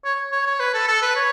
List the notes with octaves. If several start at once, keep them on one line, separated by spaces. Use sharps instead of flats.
C#5
C#5
C#5
B4
A4
A4
B4
C#5